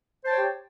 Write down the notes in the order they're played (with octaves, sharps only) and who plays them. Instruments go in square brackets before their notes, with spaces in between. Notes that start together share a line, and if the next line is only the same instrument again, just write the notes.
[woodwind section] C5
A5
G5
C#5
G4